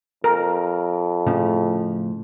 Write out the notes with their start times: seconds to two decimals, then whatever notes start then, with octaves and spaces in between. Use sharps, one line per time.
0.24 F2 A#4
1.27 A2 C#3 F3